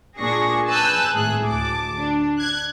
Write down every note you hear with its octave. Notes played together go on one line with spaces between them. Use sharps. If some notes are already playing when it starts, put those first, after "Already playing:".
A#2 D4 G#4 C#6 A#6
B4 G#5 A5 E6 F#6 G6
G#1 A2 G#4 F#6
D2 A5 D6
D4
F#6 G#6